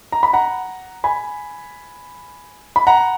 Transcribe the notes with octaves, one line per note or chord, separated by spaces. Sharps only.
A#5
B5
F#5 A#5
G#5 B5
B5
F#5 A#5